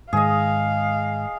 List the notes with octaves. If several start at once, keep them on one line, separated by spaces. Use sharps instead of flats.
G#2 D#3 G#3 G#4 D#5 F5